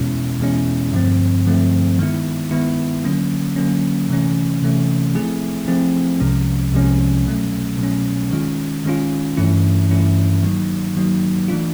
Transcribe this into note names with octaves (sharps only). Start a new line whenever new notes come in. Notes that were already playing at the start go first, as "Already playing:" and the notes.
Already playing: E2 B2 G#3 C#4 E4
E2 B2 G#3 C#4 E4
G2 D3 F3 A3 C4
G2 D3 F3 A3 C4
D#3 G#3 B3 E4
D#3 G#3 B3 E4
D3 F#3 A#3 C#4
D3 F#3 A#3 C#4
C3 E3 A3 C#4
C3 E3 A3 C#4
F3 A3 C4 E4 G#4
F3 A3 C4 E4 G#4
C2 C3 F3 G#3 C#4
C2 C3 F3 G#3 C#4
B2 F#3 A3 C#4
B2 F#3 A3 C#4
D#3 G#3 C#4 F4
D#3 G#3 C#4 F4
G2 E3 A3 C#4 E4
G2 E3 A3 C#4 E4
D#3 F#3 A#3 D#4
D#3 F#3 A#3 D#4
E3 A3 D4 F4